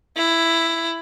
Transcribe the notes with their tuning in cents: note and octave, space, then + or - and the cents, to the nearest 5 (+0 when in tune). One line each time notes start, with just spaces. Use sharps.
E4 +10